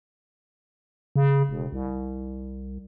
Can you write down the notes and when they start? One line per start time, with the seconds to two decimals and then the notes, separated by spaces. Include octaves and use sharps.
1.16 C#3
1.49 E1
1.72 C2